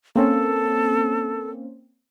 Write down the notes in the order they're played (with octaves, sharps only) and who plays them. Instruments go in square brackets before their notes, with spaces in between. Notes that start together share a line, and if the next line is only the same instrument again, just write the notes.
[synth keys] A#3 C4 C#4 [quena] A4